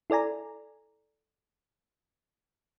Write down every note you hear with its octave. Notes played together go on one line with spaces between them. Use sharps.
E4 A4 D5 G#5 A#5